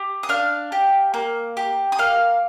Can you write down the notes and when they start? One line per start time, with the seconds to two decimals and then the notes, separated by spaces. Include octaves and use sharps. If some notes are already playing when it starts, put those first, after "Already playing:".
Already playing: G4
0.23 D#6
0.29 D4 F5 F6
0.72 G4
1.14 A#3
1.57 G4
1.92 D#6
1.99 A#3 F5 F6